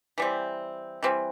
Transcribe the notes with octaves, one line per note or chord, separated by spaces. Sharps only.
E3 G3 C4
E3 G3 C4